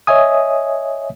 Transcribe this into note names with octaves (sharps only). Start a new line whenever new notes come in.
C#5 D#5 E5 G#5 D#6